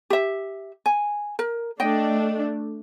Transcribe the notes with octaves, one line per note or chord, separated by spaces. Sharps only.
G4 E5
G#5
A#4
A3 D4 D#5 G5